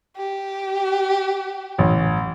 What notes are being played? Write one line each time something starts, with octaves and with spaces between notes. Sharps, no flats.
G4
A1